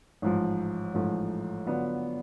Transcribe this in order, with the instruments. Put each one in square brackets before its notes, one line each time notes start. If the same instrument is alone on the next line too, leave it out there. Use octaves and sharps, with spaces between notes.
[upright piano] A1 G#2 F3
A1 G#2 F3 A3
D3 F#3 B3 D4 F4